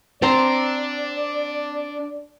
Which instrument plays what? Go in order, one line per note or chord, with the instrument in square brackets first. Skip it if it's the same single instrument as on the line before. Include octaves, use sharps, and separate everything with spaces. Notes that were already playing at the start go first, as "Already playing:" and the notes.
[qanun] C4 A#5 C6 [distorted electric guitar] D4 [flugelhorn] D5